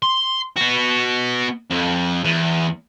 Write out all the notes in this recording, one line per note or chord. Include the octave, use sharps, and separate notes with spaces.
C6
B3 F#4
F2
E2